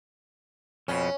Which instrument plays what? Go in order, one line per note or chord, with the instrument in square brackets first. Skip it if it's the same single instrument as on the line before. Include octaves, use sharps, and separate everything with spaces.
[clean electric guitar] F2 B2 [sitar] C#4